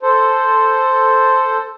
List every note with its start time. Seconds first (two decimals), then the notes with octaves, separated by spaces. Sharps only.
0.02 A4 C5